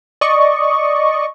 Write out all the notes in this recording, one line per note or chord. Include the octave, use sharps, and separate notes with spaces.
D5 D#5 C#6